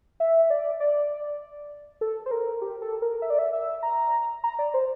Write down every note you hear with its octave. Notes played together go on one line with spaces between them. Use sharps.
E5
D5
D5
A4
C5
A#4
G4
A4
A#4
E5
D5
E5
E5
A#5
A#5
D5
C5